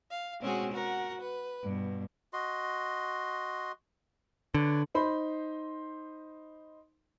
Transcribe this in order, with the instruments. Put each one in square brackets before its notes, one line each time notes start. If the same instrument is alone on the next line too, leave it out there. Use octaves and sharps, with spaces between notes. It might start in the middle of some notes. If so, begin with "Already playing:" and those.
[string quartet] F5
B2 G#3 C4 C#4 F#4 G#4
F#4 A#4 F#5
B4
G2 B2
[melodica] F#4 D#5 C6
[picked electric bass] D3 [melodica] B4 C#5 D5
[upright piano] D#4 C5 B5 C6